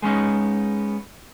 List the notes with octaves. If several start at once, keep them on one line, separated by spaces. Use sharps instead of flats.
G#3 B3 C#4 D#4